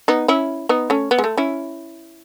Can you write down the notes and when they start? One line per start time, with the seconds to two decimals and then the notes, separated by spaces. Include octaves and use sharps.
0.08 B3 D#4
0.28 C#4 E4
0.69 B3 D#4
0.90 A3 C#4
1.11 B3
1.19 G#3
1.24 A3
1.38 C#4 E4